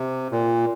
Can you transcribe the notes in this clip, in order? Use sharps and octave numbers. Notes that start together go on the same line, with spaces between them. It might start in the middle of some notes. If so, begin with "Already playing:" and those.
Already playing: C3
A#2